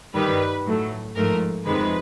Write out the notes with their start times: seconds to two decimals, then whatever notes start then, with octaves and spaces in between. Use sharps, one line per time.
0.15 G2 D#3 G3 B4
0.66 A2 F#3 A3
1.16 G#2 F3 A3 A#4
1.65 F2 C3 D#3 G#3 B4